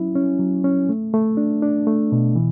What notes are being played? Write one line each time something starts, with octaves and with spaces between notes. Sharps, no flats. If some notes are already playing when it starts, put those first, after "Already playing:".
Already playing: F#3 C#4 E4
C#4
F#3
C#4
A3
A3
D4
D4
A3
B2
E3